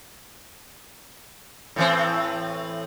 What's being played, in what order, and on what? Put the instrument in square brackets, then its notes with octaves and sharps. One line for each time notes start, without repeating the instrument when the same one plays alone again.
[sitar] A2 E3 C4